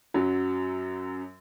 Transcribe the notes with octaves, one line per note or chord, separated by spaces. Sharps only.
F#2 F#3